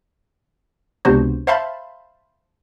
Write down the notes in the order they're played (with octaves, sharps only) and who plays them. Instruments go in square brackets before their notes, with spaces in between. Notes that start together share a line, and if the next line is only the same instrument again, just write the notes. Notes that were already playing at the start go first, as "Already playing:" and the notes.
[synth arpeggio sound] C#2 C3 B3 D4 F#4 C5
C5 E5 F5 A5 B5 C6